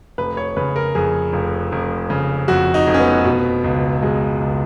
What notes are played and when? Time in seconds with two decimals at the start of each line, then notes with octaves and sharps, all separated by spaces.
0.18 F1 B4
0.37 C#5
0.57 C#3 B4
0.76 A#4
0.95 F2 G#4
1.33 F1
1.72 F1
2.10 C#3
2.48 F2 F#4
2.74 D#4
2.87 F1
2.94 C#4
3.00 B3
3.25 B2
3.64 C#2
4.02 B2 G#3
4.40 C#2